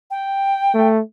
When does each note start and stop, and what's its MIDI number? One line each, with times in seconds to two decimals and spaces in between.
0.11 0.88 79
0.74 1.00 57